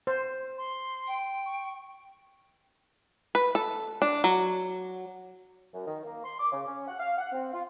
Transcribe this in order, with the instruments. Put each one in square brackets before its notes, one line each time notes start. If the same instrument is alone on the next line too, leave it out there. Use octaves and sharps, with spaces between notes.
[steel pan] C5
[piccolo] C6
[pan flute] G5
[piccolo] C#6
[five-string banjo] B4
A4
D4
F#3
[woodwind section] F#2
D#3
A#3
C6
D6
C#3
C#4
F#5
F5
F#5
C4
F4